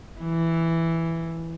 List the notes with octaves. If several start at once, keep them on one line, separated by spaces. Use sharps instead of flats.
E3